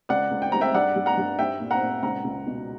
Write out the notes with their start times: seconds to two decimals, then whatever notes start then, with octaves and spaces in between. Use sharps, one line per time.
0.09 C#2 D5 F#5
0.31 C#2
0.42 G5
0.52 G3 A#5
0.61 E5 G5
0.74 G2 D5 F#5
0.96 G2
1.06 F#5 A#5
1.18 G2
1.39 G3 E5 G5
1.60 A#2
1.71 F#5 A#5
1.82 A#2
2.02 C#2 F#5 A#5
2.24 C#2
2.46 B2